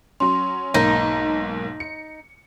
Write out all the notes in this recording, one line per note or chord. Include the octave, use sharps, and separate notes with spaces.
F#3 C#4 C6
B1 G#2 A#3 D#4
C#7